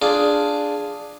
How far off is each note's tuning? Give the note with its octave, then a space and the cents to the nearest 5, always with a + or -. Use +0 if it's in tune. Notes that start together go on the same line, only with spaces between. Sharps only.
D4 +0 F4 +0 G#4 +0